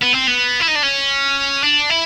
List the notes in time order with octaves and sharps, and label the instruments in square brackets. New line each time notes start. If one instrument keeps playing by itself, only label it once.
[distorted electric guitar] B3
C4
B3
E4
D#4
D4
C#4
D4
E4